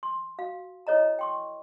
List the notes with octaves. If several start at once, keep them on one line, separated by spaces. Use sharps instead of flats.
C6
F#4 F5
E4 A4 C#5 D#5 A#5
G5 C6 C#6